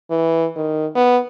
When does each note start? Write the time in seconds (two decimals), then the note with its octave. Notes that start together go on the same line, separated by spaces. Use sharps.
0.11 E3
0.56 D#3
0.95 B3